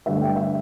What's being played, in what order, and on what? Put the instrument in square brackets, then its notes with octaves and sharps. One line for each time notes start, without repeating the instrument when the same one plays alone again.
[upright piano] G2 D3 A3 E5
G5
E5